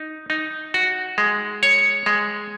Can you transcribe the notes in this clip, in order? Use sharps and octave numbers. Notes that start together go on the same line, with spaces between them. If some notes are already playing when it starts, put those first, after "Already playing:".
Already playing: D#4
D#4
F#4
G#3
C#5
G#3